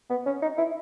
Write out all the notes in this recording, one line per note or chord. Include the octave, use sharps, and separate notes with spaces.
B3
C#4
D#4
E4